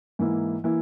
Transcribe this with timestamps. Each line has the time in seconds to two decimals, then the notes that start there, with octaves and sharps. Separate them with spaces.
0.19 G#2 E3 A#3 E4
0.64 E3 A#3 E4